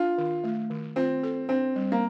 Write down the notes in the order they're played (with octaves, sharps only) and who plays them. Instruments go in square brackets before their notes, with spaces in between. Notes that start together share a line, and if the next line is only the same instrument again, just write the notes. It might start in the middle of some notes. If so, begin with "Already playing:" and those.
Already playing: [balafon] D4 [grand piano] F4
[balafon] D#3
A3
D#3
[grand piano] C4 [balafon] F4
[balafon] A4
[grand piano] C4 [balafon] D4
[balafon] G3
[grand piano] A#3